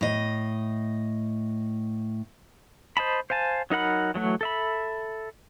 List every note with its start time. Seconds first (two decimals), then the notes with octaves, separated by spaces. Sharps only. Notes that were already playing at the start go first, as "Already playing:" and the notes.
0.01 A2 D#5
2.97 C5 D#5 A5 B5
3.30 C5 F5 G#5 A5
3.70 F#3 D#4 A#4 F#5 B5
4.14 E3 F#3 A3 F#4
4.41 A4 E5 B5